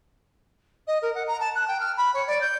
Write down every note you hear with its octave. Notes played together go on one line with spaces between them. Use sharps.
D#5
A#4
F#5
A#5
A5
F#6
G5
F6
B5
C#5
D5
G6